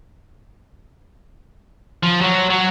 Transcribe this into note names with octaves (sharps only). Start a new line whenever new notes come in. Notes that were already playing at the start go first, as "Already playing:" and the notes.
F3
F#3
F#3